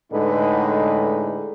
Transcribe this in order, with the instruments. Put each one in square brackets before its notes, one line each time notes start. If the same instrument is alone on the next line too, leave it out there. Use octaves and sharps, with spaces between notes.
[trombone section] A2 D3 G#3 D#4 B4